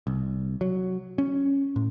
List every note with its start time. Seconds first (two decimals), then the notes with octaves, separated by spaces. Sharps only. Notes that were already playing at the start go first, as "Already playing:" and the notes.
0.07 C2
0.61 F#3
1.18 C#4
1.76 A2